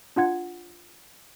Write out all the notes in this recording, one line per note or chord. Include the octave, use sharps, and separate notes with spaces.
D4 F4 F#5 G#6